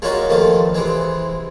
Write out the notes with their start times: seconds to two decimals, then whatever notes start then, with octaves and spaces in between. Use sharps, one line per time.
0.02 G#3 A#3 C#4 D#4 F4 F#4
0.29 G2 D#3 F3 A3 A#3
0.75 C3 E3 G#3